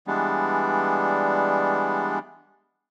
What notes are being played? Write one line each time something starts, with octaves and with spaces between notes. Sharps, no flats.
E3 G3 G#3 B3 D4